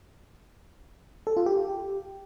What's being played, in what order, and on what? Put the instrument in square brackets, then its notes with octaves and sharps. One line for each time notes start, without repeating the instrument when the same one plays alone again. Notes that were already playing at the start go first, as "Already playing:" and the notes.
[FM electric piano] A4
F4
G4